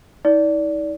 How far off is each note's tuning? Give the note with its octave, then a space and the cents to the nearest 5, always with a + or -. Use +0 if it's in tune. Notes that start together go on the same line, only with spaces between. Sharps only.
D#4 +45 D5 -15